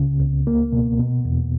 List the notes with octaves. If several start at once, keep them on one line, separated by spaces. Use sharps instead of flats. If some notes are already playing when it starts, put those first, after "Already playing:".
Already playing: C#2 C#3
C#2
A#3
B2
B2
E2